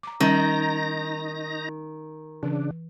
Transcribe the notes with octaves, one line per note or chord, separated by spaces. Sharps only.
A#5 D6
D#3 G3 C#4 D#4 A#5 A#6
C#3 E3 D4